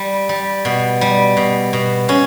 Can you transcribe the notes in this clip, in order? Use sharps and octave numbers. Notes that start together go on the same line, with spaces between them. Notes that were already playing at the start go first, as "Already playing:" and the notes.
Already playing: G3
G3
B2
G3
B2
B2
B2 C#4